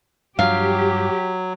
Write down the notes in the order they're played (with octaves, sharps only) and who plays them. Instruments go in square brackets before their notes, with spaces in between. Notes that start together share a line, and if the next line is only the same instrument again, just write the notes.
[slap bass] G2 F3 [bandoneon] F#3 [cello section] G4 [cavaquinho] F5